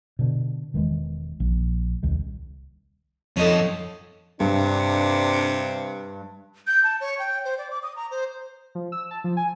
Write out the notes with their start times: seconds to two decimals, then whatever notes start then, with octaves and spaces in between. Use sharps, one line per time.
0.19 B2 D3
0.74 E1 D#3 E3 G#3
1.40 A#1
2.03 D#1 C2 C3 D#3
3.37 F2 C#4 D#4 A4
4.40 G2 C3 D4
6.67 G6
6.84 A5
7.01 C#5
7.19 G5
7.45 C5
7.58 D5
7.71 D6
7.83 D#6
7.96 A#5
8.11 C5
8.75 F3
8.92 E6
9.11 A5
9.24 F3
9.37 G#5